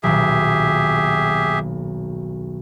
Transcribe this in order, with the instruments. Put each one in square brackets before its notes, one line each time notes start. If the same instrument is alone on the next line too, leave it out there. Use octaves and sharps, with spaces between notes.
[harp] D#1 B1 [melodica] G4 G#4 E5